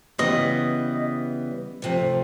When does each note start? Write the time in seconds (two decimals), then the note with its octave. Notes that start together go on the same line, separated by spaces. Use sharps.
0.18 C#3 E3 G3 B3 D#5
1.82 D2 C3 F3 A3